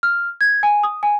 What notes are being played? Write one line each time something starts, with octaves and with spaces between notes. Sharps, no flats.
F6
G#6
G#5
D#6
G#5